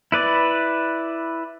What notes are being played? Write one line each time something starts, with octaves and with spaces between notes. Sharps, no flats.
E4 B4 D5